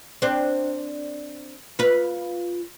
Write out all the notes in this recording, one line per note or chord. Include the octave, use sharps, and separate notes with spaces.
C4 D4
F4 B4